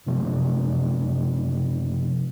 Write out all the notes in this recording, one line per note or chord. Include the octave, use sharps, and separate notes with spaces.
F#1 C3 F3